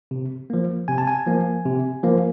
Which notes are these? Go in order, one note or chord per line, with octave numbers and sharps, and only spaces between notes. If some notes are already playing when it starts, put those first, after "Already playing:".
C3
F3 A#3
C3 G#5
A5
G#5
F3 A#3
C3
F3 A#3